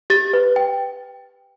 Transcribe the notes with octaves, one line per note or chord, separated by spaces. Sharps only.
G4 A6
B4
G5